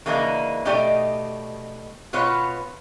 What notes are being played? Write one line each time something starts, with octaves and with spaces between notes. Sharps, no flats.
C#3 E3 A#3 B3 D4 D#4
B2 A3 D#4 G4 D5 D#5
B2 B3 F4 B4 C#5